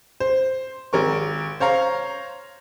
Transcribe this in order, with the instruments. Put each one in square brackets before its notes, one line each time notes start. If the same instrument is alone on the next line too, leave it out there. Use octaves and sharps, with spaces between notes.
[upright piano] C5
G#1 A#4 C#6
C5 C#5 F5 A#5